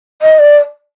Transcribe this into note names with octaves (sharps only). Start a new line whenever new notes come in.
D#5
D5